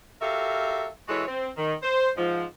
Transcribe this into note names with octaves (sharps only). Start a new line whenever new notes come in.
F#4 G4 A4 A#4 E5 F5
E3 G#3 E4 F#4 A4 C#5
C4
D#3
C5
G#2 F3